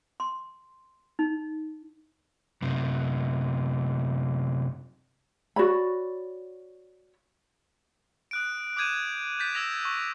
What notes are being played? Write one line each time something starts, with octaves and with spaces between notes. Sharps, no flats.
C6
D#4
F#2 C3
F#4 C#5 D5 B5
D#6 F#6 D7
D6 D#6 G6 G#6 D#7 E7
F#6 G6 A6 B6
E6 G#6 A#6 E7 F7
C#6